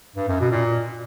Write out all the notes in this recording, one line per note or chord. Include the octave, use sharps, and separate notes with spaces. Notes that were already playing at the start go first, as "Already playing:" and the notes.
G2
F#2
B2
A#2